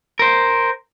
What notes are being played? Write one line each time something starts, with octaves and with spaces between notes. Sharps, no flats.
A#4 C5